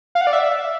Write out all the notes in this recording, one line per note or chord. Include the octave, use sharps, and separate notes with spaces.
F5
F#5
D5
E5